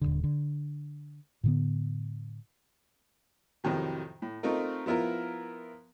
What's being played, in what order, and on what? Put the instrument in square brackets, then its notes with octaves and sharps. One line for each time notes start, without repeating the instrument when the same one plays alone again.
[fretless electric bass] D#1 G#1 D3
D3
A2 D3 B3
[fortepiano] F2 A2 C3 D#3 F#3
A2
A3 C4 D#4 F4 A#4
F3 B3 E4 F4 A#4